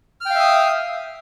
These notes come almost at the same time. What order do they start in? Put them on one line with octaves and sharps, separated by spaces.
F6 G5 F5 E5 D#6